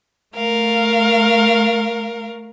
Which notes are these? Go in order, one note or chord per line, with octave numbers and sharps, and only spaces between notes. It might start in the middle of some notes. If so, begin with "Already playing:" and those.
A3 A#4 F5